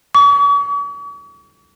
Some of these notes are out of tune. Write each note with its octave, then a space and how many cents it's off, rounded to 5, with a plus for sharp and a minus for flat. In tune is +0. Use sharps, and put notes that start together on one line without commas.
C#6 +45